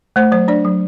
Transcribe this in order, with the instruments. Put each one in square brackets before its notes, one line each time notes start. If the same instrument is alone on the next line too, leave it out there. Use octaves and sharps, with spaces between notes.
[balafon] A3 C5
F#3 C5
D4 D5
F#3